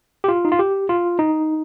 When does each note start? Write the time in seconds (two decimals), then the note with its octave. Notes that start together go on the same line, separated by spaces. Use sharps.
0.24 G4
0.28 F4
0.45 D#4
0.52 F4
0.59 G4
0.89 F4
1.19 D#4